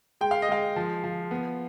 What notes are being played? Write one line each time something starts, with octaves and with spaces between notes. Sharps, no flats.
G#3 G5
F5
D#5
G#3 F5
F3
F3
B3